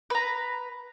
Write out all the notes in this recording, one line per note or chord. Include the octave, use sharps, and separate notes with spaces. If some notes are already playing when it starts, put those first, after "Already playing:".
B4 A#5